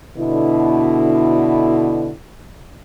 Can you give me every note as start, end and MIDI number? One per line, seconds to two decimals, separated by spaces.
0.17 2.10 47
0.17 2.10 50
0.17 2.10 64